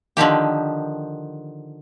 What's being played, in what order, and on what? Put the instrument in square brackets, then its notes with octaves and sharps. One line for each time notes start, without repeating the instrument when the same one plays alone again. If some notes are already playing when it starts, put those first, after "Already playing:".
[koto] D3 D#3 F3 G4